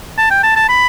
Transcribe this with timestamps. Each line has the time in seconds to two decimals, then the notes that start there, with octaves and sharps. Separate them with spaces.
0.18 A5
0.31 G5
0.43 A5
0.56 A5
0.69 B5